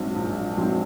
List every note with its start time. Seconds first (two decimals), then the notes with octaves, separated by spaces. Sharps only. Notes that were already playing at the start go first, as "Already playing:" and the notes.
Already playing: A#1 G#2 F#3 C4
0.16 A#1
0.57 G#2 F#3 C4